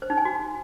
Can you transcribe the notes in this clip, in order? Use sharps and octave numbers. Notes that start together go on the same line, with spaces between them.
C5
D#4
G#5
F#4